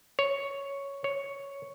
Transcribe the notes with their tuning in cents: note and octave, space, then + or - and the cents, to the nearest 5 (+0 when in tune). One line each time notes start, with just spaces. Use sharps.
C#5 +5
C#5 +5